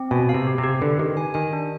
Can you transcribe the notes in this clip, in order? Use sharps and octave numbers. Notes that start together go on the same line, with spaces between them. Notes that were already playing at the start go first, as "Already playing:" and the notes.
Already playing: C4
B2 G#5
F5
C3
G4
C3
G4
D3 B4
D#3 G4
G#5
D#3 G#5
D4